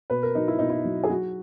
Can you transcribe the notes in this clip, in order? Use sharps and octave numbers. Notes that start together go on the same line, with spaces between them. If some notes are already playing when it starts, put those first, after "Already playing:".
B2 B4
A#4
F#3 D#4
E4
B2 D#4
E4
F#3
G#4
F#3 F#4